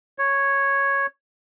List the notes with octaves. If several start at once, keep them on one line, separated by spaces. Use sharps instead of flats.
C#5